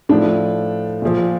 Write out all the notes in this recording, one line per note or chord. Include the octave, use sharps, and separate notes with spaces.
A2 F3 D4
A#2 F3